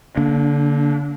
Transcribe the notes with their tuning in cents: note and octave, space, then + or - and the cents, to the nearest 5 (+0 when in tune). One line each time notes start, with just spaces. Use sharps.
D3 -30 A#3 +5 D4 +0